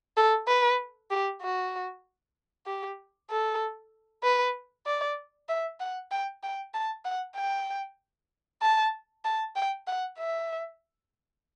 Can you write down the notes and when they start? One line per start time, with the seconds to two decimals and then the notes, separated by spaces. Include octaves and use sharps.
0.17 A4
0.48 B4
1.11 G4
1.42 F#4
2.66 G4
3.30 A4
4.24 B4
4.86 D5
5.49 E5
5.80 F#5
6.11 G5
6.43 G5
6.74 A5
7.05 F#5
7.37 G5
8.62 A5
9.25 A5
9.56 G5
9.87 F#5
10.18 E5